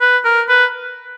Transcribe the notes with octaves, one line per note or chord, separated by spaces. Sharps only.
B4
A#4
B4